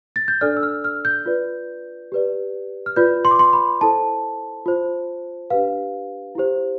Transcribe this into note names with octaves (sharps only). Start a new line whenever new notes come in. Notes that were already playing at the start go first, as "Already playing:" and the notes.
A6
G6
D4 A4 D5 F6
E6
F6
F6
G6
F4 B4 D5
G4 B4 D5
F6
F4 B4 D5 G6
C6
D6
C6
B5
E4 A4 C5 A5
F4 C5
D4 G4 B4 F5
E4 G4 C5